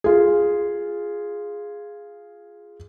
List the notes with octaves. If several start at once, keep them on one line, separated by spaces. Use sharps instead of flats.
F4 G#4